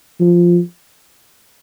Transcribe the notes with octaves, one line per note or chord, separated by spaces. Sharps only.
F3